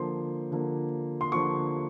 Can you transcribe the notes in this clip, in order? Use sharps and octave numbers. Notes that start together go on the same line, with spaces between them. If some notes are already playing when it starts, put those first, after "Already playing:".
Already playing: D3 F3 A#3 C6
D3 F3 A#3
C6
D3 F3 A#3 C#6